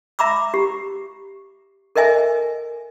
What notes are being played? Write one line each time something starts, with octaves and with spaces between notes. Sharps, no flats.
E5 A#5 B5 D6 E6
G4
A4 A#4 D#5 E5 G#5